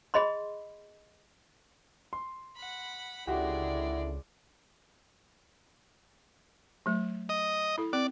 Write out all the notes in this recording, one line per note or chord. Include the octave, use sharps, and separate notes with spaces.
G#4 D#5 B5 C6
C6
F#5 B5
C#2 D3 G#3 E4 F#4 G4 D5
F#3 A3
D#5
E4 A4
C4 D5